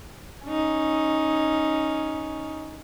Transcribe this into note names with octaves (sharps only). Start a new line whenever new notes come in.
C#4 D#4